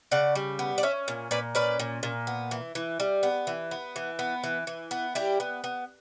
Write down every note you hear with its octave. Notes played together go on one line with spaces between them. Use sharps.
C#3 D5 F#5
G3
B3
D5
C#4 C#5 E5
A#2
A#2 B4 D5
C#4 B4 D5
A#2
A#2
B3
E3
E3
G3
B3
E3
B3
E3
B3
E3
E3
B3
G3 E4 G4
B3
B3